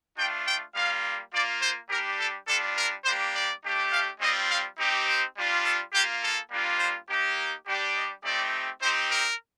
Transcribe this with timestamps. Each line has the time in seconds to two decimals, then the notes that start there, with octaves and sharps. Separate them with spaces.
0.17 A3 D4 F4 G5
0.46 G5
0.74 G3 A#3 F4 F5
1.32 A#3 F4 D5
1.61 C5
1.89 G3 D4 G4 A#4
2.18 A4
2.47 G3 D4 F4 A4
2.76 A#4
3.04 G3 A#3 D4 G4 C5
3.34 D5
3.63 A3 D4 G4
3.90 F5
4.20 G3 C4 F4 D#5
4.48 F5
4.77 C4 D#4 G4
5.06 C5
5.35 G3 D4 F4
5.64 A4
5.92 A#3 F4 G4
6.21 A4
6.50 G3 A#3 D4 F4
6.79 C5
7.07 A#3 D#4 G4
7.65 G3 D4 G4
7.94 D#5
8.23 A3 C4 D#4 G4 D5
8.80 C4 D#4 G4 C5
9.09 A#4